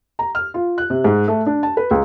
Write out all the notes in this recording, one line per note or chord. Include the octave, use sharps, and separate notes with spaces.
A#5
F6
F4
F#6
C3
G#2
A3
D4
A5
B4
C#2